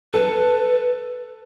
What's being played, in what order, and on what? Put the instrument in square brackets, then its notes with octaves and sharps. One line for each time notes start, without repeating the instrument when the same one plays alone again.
[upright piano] A4 [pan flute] B4